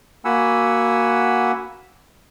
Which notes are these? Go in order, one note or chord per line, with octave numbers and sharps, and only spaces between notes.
A#3 F#4 F#5 G#5 B5 E6